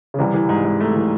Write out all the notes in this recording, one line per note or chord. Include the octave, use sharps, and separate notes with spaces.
C#3
C2 C3 E3
E3
G#2
G#2
A3
E3